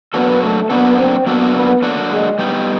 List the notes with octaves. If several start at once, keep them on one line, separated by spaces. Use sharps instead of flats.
F#3 A#3 B3 D4 F#4 A4
A3
F#3 A#3 B3 D4 F#4 A4
C4
F#3 A#3 B3 D4 F#4 A4
B3
F#3 A#3 D4 F#4 A4
G#3
G3 B3 D#4 G4